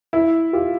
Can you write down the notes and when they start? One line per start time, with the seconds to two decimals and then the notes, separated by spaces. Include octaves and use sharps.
0.13 E4
0.53 F4 G4